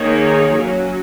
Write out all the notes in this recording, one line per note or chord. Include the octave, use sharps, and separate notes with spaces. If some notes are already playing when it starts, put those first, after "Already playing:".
Already playing: D#3 A#3 D#4 G#4 C#5
F#3 C#4 F#4